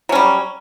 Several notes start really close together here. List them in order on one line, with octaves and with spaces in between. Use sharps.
F#3 C#4 G3